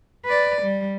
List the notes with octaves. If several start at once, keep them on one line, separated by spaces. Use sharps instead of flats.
B4 D5
G3